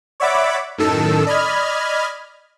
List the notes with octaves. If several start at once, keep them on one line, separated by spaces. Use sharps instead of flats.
C#5 D5 E5 F#5 B5 D6
F#2 A2 D#3 A4 E6
D5 D#5 B5 F6 G#6